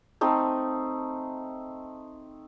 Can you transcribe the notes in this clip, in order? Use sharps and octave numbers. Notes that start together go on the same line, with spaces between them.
A3 C4 D#4